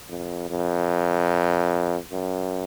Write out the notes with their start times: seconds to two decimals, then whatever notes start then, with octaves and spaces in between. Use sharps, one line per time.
0.09 F2
0.50 F2
2.12 F#2